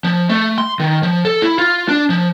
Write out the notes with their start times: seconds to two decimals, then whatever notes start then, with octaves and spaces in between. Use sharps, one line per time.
0.04 F3
0.29 A3
0.58 C6
0.80 D#3
1.03 F3
1.25 A4
1.42 E4
1.59 F4
1.88 D4
2.10 F3